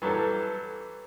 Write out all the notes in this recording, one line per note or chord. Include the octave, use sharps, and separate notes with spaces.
E3 F#3 G3 A4